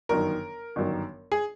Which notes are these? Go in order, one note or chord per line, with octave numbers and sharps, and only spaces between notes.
G1 F#2 D#3 A#4
G1 F#2 D#3
G#4